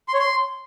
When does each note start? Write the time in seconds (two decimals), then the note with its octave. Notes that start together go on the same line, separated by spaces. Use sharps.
0.08 C6
0.14 C#5
0.19 C6